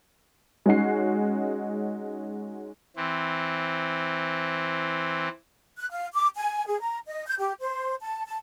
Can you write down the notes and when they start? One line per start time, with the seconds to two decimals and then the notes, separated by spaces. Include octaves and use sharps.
0.66 G#3 C#4 D#4 F#4 C7
2.97 E3 C4
5.79 F#6
5.91 F5
6.13 D6
6.36 G#5
6.67 G#4
6.80 A#5
7.07 D#5
7.26 G6
7.39 G4
7.60 C5
8.02 A5
8.27 A5